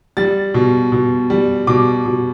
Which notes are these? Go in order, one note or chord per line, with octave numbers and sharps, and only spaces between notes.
G3 A6
B2
B2
G3
B2 D6
B2